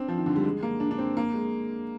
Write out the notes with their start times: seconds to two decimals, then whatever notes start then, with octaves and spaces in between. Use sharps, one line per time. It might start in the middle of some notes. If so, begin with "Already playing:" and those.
Already playing: C4 D4
0.08 F3
0.18 D#3
0.26 D3
0.36 G3
0.44 G#3
0.63 A#3
0.80 D4
0.91 D4
0.98 C4
1.17 A#3
1.34 G#3